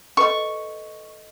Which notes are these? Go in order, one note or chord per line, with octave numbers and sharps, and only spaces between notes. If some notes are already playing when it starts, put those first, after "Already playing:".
A4 B4 D#5 C#6